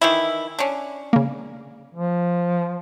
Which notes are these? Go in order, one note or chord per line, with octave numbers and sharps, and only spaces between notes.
D#3 E3 E4
C#4 D4
C#3 A#3
F3